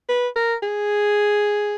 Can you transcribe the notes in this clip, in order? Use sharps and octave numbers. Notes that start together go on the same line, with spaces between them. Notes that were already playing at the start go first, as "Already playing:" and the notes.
B4
A#4
G#4